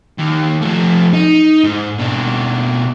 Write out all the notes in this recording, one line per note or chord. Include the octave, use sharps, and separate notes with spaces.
D#2
F3 A3
D#4
G#2
B2 D4